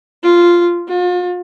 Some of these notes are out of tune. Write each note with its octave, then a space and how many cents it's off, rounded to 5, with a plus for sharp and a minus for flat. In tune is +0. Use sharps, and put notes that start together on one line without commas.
F4 -5
F4 +40